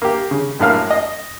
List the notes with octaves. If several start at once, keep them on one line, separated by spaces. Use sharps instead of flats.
A#3 G4
C#3
F#2 A2 A#3 F5 F6
D#5